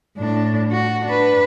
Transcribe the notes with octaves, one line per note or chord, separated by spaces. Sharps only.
A2 D4
F#4
D4 B4